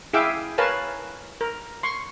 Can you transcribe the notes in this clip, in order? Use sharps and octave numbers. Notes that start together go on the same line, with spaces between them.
E4 G#4 E5 F5 G5 D6
A#4 B4 C#5 F5 G#5 A5
A#4
C6 C#6